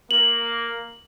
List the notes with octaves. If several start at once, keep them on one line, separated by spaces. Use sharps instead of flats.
A#3 F#7